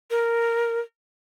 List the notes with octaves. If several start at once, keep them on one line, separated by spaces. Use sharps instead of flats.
A#4